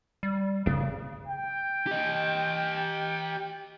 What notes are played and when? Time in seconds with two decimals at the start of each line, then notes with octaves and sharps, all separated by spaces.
0.23 G3
0.66 C#2 F#2 C#3 A#3
1.28 G5
1.87 G4 D#5